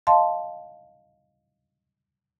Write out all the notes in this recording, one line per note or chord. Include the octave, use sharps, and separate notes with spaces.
D#5 F5 A5 C6